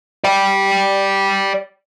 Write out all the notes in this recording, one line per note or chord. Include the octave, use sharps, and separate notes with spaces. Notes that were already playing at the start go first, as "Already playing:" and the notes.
D5 G5